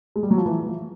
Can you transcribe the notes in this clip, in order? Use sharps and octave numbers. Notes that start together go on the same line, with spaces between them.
G#3
G3
F#3
F3
E3
F3